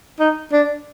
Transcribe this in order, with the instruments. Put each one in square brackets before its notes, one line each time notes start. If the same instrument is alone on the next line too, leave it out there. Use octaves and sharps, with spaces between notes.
[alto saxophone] D#4
D4